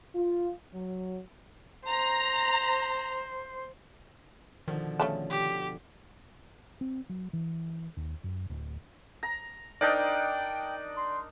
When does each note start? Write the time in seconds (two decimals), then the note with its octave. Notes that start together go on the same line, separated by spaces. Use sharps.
0.15 F4
0.74 F#3
1.87 C5 A#5
4.68 B2 D3 D#3 F3
5.00 C#3 A3 A5
5.31 G4
6.81 C4
7.09 F#3
7.33 E3
7.97 D#2
8.24 F#2
8.50 D1
9.23 A#5
9.81 D4 D#4 A#4 D5 D#5 G5
10.97 C6